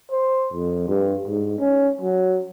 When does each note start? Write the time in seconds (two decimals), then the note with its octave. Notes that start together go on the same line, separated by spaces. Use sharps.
0.11 C5
0.53 F2
0.88 G2
1.28 G#2
1.59 C#4
2.01 F#3